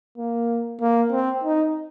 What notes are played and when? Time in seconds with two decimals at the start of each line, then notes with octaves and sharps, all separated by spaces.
0.18 A#3
0.81 A#3
1.11 C4
1.44 D#4